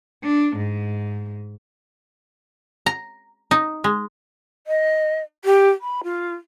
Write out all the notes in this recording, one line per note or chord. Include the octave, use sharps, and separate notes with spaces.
D4
G#2
A#5
D#4
G#3
D#5
G4
B5
F4